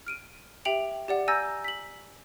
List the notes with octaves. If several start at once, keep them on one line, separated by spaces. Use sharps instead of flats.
F6 D7 D#7
G4 E5 G5 D7 F7 F#7
G4 D5 F#5
G#5 A#5 E6 G6 A6 A#6
B6 F#7